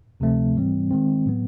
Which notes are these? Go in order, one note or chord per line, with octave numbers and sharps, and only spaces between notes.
D2 C3 F3 A3 C4
G#2 E3 G3 C4
D#3 G#3 C4
A2 F#3 B3